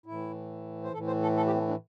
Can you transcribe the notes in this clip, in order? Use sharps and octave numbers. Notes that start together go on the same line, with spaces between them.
A2 E4
E3
C5
A2 E3 A4
C5
A4
A4
G4
C4
A3
D4